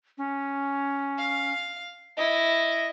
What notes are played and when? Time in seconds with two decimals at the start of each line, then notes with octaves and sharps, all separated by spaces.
0.18 C#4
1.18 F5
2.17 E4 D#5